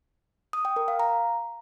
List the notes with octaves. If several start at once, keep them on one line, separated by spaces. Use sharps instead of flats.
D#6
G5
A#4
F5
A#5